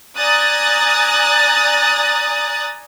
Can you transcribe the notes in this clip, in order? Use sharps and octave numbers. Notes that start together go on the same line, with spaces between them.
D5 G#5 A#5 D#6 F#6 A6